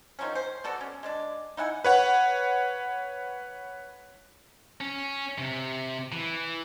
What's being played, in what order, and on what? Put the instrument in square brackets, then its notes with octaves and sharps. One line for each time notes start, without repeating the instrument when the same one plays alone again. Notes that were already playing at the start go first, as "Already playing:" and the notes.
[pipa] D#3 F3 F#3 C#4
C5
B3 F#4 A4 D5
C#4
G#3 D4 D5
D#4 E4 F#5 G#5
[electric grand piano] B4 C#5 F#5
[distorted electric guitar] C#4
C3
E3